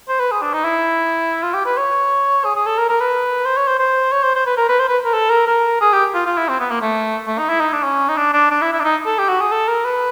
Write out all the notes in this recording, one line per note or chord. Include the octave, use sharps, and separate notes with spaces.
C5
B4
G#4
D4
D#4
E4
F4
G4
B4
C#5
G#4
G#4
A4
A#4
A#4
B4
C5
C#5
C5
C5
C#5
C5
C5
B4
A#4
B4
C5
B4
A#4
A4
A#4
A#4
G#4
G4
F4
F4
E4
C4
B3
A#3
A3
A3
D#4
E4
D#4
D4
C#4
D#4
D4
D4
D4
E4
E4
D4
D#4
A4
G4
F#4
G#4
A4
A#4
B4